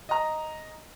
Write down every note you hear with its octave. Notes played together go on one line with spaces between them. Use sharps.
D#5 A#5